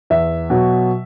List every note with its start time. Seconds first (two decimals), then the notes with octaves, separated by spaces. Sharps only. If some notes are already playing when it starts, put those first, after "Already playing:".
0.10 E2 E5
0.50 B2 F#3